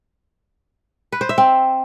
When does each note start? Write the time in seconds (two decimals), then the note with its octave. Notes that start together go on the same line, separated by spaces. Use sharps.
1.12 B4
1.21 C5
1.29 E5
1.38 C4